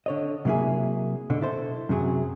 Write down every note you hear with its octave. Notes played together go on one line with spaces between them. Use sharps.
D3 C#5 D#5
C3 F#3 A#3 E4 G#4
B2 D3
E4 A4 C5
F#2 C3 F#3 G#4